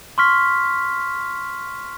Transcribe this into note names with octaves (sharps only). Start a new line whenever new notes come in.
C6 C#6 F6 B6